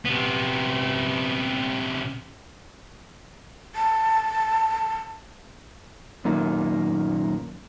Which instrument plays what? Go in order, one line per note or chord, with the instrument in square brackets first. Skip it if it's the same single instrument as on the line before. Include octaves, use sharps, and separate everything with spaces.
[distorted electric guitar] C3 B3
[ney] A5
[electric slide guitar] F#2 A#2 D#3 A#3